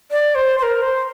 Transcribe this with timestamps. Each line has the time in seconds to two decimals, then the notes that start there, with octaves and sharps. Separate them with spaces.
0.11 D5
0.35 C5
0.58 C5
0.63 A#4
0.82 C5